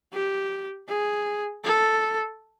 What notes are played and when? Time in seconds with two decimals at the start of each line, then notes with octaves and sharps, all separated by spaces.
0.13 G4
0.88 G#4
1.64 A4